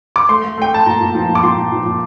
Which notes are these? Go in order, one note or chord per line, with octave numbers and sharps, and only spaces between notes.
D6
A3 C6
A3
A3 G5
A3 A5
A#2 A#5
A#2
F3
A#2
D6
A#2 C6
A#2
F3
A#2